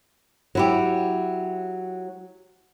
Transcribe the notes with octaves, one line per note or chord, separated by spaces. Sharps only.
F#3 E4 G4